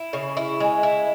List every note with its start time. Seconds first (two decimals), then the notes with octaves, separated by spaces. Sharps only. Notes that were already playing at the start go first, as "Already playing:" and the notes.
Already playing: E4
0.13 C#3
0.37 E4
0.60 G#3
0.83 E4